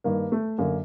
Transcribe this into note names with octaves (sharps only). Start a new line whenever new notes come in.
G2 D#3 A#3
A3
F#2 D3 A#3